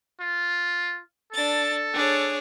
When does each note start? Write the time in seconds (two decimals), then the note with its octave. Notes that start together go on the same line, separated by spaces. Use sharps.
0.21 F4
1.33 D4 A4 A6
1.94 D4 G#4 C#5